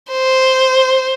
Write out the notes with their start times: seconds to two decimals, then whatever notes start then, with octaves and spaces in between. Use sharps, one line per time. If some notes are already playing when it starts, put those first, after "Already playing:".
0.11 C5